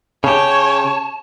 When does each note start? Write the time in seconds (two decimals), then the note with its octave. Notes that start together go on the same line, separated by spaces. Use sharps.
0.24 C#3 G4 C#5 A5